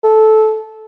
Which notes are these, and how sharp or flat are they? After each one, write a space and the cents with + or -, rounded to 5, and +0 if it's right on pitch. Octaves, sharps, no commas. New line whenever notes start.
A4 -15